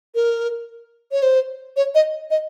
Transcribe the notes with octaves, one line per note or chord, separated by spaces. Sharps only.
A#4
C#5
C5
C#5
D#5
D#5